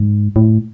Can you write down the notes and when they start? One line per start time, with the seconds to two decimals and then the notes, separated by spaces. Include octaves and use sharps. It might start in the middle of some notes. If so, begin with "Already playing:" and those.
Already playing: G#2
0.36 A2